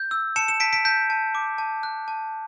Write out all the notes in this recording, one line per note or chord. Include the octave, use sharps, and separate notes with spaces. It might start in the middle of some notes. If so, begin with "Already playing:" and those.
Already playing: G6
E6
A5 C#7 E7
C#7 E7
A5 B6 D7
B6 D7
A5 G6 B6
A5
D6
A5
F#6
A5